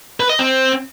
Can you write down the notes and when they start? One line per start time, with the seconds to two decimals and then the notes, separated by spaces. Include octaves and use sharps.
0.20 B4
0.30 D#5
0.39 C4